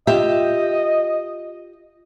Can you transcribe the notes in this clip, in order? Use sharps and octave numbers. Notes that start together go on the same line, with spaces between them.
F4 G4 D#5 E5